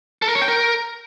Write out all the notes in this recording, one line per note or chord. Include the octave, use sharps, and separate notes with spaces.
A4
A#4
C#5
G5
A#4